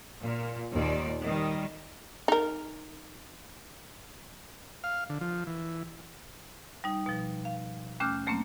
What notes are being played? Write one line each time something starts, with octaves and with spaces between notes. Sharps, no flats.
A#2
D#2 A#2 D5
D#3 G3
D#4 A#4
F5
D3
F3
E3
G3 D#4
B2 F3
F5
D#2 A3 C#4 D6 F6 G6
F#3 A3 A#3 C4 C#4